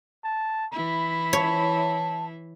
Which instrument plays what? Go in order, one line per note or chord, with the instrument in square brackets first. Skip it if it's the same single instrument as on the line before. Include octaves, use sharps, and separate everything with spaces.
[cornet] A5
[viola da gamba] E3 E4 [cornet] B5
[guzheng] C#5 [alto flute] A5